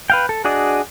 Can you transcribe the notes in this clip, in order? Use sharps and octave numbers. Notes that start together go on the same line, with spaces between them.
B4 F5 G5
A4
D4 F#4 G#4 D5 D#5